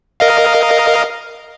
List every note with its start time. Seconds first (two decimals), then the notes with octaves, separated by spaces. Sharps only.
0.20 A#4 D#5 F5